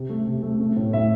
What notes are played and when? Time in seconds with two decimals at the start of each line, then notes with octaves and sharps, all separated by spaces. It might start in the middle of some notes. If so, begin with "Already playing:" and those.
Already playing: C3
0.09 A3
0.27 C3
0.43 A3
0.60 A3
0.76 A2
0.93 A2 E5